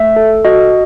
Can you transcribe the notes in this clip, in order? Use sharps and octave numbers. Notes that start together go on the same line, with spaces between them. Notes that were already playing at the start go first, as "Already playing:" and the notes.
Already playing: A3 E5
A4
F#4 D#5